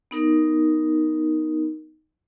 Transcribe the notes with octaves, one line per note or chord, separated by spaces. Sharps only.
B3 D#4 A#4